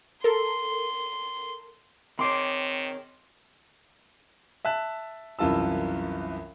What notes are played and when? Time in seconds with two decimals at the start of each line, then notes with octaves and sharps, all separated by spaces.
0.24 A4 A#4 C6
2.19 D#3 C4 G#4 C#5 C6 D6 C7
4.65 E5 A5 F#6 E7
5.39 C2 F#2 E3 F4 A5 E6